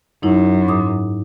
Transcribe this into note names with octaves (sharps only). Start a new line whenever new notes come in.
F#2 D#4 E4
G#2 D6 D#6